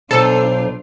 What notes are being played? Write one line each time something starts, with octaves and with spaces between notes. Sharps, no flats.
B1 D4 F4 A4 C5